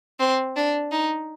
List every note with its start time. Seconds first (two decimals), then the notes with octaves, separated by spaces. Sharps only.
0.20 C4
0.56 D4
0.92 D#4